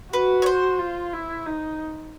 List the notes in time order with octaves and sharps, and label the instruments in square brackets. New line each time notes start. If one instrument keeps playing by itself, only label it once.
[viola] F#4 [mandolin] B4
[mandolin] C#5
C5
[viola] F4
E4
D#4